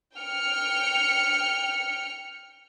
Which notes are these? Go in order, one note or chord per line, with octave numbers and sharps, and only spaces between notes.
G5 F6 C#7